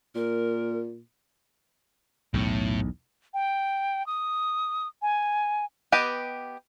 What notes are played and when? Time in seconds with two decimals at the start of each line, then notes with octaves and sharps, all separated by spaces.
0.15 A#2 A#4
2.34 B1 E2 A2
3.34 G5
4.07 D#6
5.02 G#5
5.92 B3 G4 B4 D#5